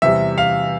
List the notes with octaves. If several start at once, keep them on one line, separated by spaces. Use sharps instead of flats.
E2 C3 G3 E5
F5